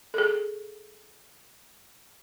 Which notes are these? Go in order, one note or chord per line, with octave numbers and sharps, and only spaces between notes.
G#4 A4